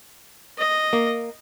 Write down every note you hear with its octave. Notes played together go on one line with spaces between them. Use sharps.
D#5
A#3